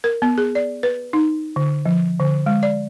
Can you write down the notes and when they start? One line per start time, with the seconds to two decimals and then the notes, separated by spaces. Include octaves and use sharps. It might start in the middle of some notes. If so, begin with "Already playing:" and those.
0.04 A#4
0.22 B3
0.38 G#4
0.55 D5
0.83 B4
1.13 D#4
1.56 D3
1.86 F3
2.20 D3
2.46 G#3
2.63 D5